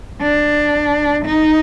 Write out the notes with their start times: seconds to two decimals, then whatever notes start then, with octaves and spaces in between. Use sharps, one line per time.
0.22 D4
1.25 D#4